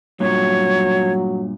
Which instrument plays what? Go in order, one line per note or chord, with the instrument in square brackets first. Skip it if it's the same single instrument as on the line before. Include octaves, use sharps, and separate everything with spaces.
[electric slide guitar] G2 A#2 [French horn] F#3 [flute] C#5